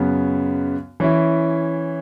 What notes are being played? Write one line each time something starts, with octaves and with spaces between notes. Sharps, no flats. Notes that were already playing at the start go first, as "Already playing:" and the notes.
Already playing: F#2 C#3 F#3 B3
E3 C#4 E4